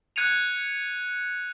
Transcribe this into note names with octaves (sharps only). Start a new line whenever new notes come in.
F#6 G#6 C#7 D#7 F7